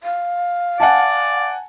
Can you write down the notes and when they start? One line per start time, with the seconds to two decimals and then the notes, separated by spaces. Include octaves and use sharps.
0.03 F5
0.80 D5 F#5 G#5 A5